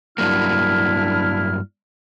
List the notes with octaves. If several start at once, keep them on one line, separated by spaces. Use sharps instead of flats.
G2 F#3 A#3 D4 E4 F6